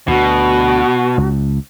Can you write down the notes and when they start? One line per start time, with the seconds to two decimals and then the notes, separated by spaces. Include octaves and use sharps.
0.08 D2 B2 F#4
1.18 C#2